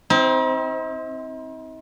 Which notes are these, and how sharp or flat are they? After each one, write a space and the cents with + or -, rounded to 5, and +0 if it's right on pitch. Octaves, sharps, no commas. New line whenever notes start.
C4 +0 D#4 +45